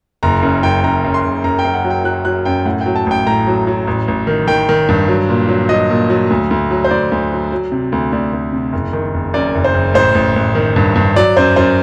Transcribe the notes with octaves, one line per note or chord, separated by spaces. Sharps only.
F#1 A#5
F#2
F#2 G5
F#2 A#5
F#2
C6
F#1
F#2 A#5
G5
F#2
F#5
F#3
G5
F#3 F#6
F#3 F#6
F#2 G5
A2 F#5
F#3 G5
A5
A1 G5
A2 A#5
F#3
F#3
A1
A1
D#3
D#3 G5
D#3
G2
F#3
A#2
F#3
F#3 D#5
A#2
F#3
D2
D2
F#3
C5
D2 D5
D2
F#3
F#3
C3
D2
D2 D5
D2
C3
F#1
D#3
F#1
F#2 D5
F#1
C5
F#1
A1 C5
A1
A1
D#3
G2
G2
F#3 D5
F#2 C5
F#2 C5